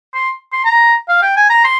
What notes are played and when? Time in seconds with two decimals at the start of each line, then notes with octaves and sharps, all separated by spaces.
0.14 C6
0.53 C6
0.65 A#5
1.09 F5
1.22 G5
1.37 G#5
1.50 A#5
1.64 C6